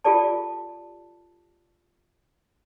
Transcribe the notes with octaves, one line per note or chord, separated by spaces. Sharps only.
F4 G4 A4 D5 A5